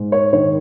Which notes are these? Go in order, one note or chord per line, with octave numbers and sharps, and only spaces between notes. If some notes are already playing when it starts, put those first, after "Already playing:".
Already playing: G#2 G#3
C#5
D#3 C#5